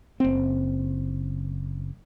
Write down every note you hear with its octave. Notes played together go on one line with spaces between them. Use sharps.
F#1 C4